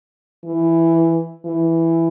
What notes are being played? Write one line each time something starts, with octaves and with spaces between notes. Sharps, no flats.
E3
E3